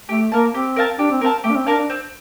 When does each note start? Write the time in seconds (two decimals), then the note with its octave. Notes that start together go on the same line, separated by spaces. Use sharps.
0.09 A3 G4
0.31 A#3 A#4 F5 A5
0.54 C4 G4
0.76 A#4 F5 A5
0.99 D4 G4
1.11 C4
1.21 C4 A#4 F5 A5
1.44 A3 G4
1.51 D4
1.56 C4
1.67 D4 A#4 F5 A5
1.78 D4
1.90 C4